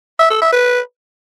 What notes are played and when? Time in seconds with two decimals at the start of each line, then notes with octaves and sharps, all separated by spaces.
0.19 E5
0.31 A4
0.42 E5
0.53 B4